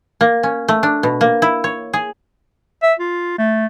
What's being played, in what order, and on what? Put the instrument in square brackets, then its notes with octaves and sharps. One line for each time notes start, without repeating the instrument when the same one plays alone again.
[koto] A#3
C#4
A3
D4
B2
A#3
E4
C#5
G#4
[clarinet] E5
F4
A3